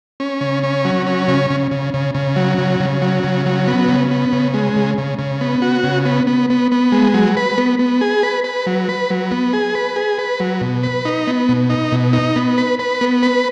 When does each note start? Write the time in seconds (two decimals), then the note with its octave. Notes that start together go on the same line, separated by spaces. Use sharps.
0.20 C#4
0.41 C#3
0.63 C#4
0.85 F#3
1.07 C#4
1.28 C#3
1.50 C#3
1.71 C#3
1.94 C#3
2.15 C#3
2.36 F#3
2.58 C#3
2.80 C#3
3.02 F#3
3.23 C#3
3.46 F#3
3.67 B3
3.88 C#3
4.11 B3
4.33 C#3
4.54 G#3
4.76 C#3
4.98 C#3
5.19 C#3
5.41 B3
5.62 F#4
5.84 C#3
6.05 B3
6.27 B3
6.50 B3
6.72 B3
6.92 G#3
7.14 F#3
7.37 B4
7.58 B3
7.79 B3
8.01 G#4
8.23 B4
8.44 B4
8.67 F#3
8.89 B4
9.10 F#3
9.31 B3
9.53 G#4
9.75 B4
9.96 G#4
10.18 B4
10.40 F#3
10.61 B2
10.83 B4
11.05 D#4
11.27 B3
11.49 B2
11.70 D#4
11.92 B2
12.13 D#4
12.36 B3
12.58 B4
12.79 B4
13.01 B3
13.23 B4